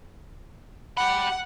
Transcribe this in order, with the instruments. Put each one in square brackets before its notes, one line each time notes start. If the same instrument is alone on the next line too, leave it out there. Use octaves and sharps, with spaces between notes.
[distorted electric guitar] G4 B5 [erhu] F#5